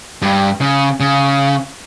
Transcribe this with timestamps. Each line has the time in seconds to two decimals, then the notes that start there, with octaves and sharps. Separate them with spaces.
0.22 G2
0.61 C#3
1.00 C#3